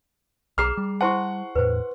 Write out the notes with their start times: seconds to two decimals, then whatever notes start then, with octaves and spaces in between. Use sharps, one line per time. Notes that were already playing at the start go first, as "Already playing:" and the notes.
0.58 B1 G#4 A#5 D6 F6 C7
0.77 G3
1.01 E4 C5 F#5 A5 C6 C#6
1.56 E2 A2 B4 C5